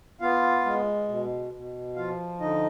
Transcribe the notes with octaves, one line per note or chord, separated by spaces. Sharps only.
B3 F4 F5
G#3
B2
B2
F3 F4 F5
D3 D#4 D#5